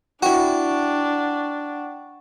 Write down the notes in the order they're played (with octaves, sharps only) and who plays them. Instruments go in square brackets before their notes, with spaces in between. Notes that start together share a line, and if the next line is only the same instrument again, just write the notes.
[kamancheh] D4 [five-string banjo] E4 F#4 [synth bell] F#5 G5 C#6